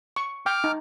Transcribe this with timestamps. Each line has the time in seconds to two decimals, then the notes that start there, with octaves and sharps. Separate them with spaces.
0.16 C#6
0.46 G5 D6 F6
0.64 D#4